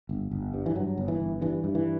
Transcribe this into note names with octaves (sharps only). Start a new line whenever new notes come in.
G1
G1
G2
E3
G2 F#3
G1
E3
G1
G2 E3
G2
E3